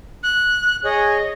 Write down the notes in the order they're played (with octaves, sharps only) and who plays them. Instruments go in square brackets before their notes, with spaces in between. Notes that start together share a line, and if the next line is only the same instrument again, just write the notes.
[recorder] F#6
[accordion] G#4 C#5 [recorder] D#5